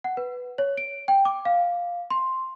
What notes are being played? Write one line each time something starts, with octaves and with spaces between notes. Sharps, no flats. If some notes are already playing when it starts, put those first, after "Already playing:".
F#5
B4
C#5
D7
G5
D6
F5
C6